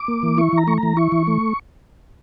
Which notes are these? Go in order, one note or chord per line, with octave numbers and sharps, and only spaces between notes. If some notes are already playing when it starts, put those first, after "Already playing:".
Already playing: D6
A#3
E3
E4 C#6
E3 A#5
A3 C#6
A#5
E3
E4 C#6
E3
A3